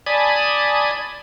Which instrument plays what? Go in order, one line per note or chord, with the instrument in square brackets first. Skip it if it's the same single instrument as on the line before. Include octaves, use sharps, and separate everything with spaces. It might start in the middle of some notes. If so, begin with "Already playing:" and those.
[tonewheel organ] D5 G#5 A5 B5 D#6